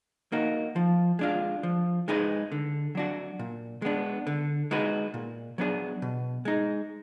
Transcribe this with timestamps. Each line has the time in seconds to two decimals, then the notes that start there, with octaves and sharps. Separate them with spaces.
0.32 A#3 D#4 F#4
0.76 F3
1.19 G#3 D4 F4
1.63 F3
2.08 G#3 D#4 G#4 B4
2.52 D3
2.95 F#3 D4 F#4
3.39 A#2
3.82 G#3 B3 D4
4.27 D3
4.71 G#3 D#4 F#4 B4
5.14 A#2
5.58 F#3 B3 D4 G#4
6.02 B2
6.45 G#3 D#4